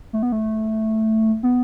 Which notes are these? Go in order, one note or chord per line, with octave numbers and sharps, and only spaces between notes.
A3
B3
A3
B3